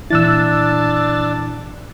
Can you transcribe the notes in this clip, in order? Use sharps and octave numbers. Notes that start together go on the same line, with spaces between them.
A#2 E3 D4 E4 E6 F#6 A6